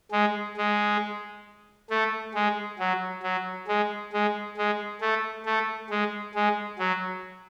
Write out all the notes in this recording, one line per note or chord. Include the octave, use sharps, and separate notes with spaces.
G#3
G#3
A3
G#3
F#3
F#3
G#3
G#3
G#3
A3
A3
G#3
G#3
F#3